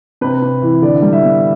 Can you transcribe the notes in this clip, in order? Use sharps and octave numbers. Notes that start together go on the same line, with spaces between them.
C3 B4
C3
E3
D3 D5
G3
E5
B3